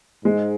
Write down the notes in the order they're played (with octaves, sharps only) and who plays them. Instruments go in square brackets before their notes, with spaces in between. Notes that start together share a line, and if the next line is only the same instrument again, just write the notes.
[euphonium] G#2 [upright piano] G#3